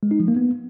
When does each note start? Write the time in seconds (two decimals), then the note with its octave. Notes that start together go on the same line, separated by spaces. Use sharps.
0.03 G#3
0.11 D#4
0.20 F3
0.28 A#3
0.37 B3